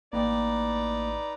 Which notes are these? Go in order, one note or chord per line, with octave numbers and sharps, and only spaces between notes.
A1 A#3 D#4 B4 D5 G5 A#5